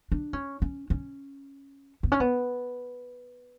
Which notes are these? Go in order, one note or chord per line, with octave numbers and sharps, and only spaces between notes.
D4
C#4
C#4
C#4
B3
C#4
B3